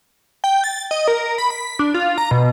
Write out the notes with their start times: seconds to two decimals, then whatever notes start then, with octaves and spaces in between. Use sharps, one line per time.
0.44 G5
0.64 A6
0.91 D#5
1.08 A#4
1.38 B5
1.50 B6
1.79 D4
1.94 F4
2.18 A#5
2.31 B2